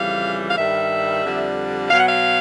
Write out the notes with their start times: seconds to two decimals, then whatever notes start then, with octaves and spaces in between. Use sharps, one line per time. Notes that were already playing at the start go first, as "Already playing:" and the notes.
Already playing: F2 C#3 E3 G3 F5
0.49 F5
0.57 G2 D#3 G3 E5
1.24 F2 D3 G3
1.90 B2 F#3 F5
1.99 F#5
2.07 F5